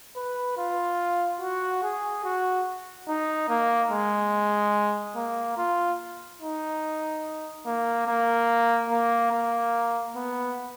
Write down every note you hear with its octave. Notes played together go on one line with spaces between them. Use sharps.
B4
F4
F#4
G#4
F#4
D#4
A#3
G#3
A#3
F4
D#4
A#3
A#3
A#3
A#3
B3